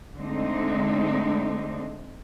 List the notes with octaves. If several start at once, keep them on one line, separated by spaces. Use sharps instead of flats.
D3 G#3 A3 C4 D4 D#4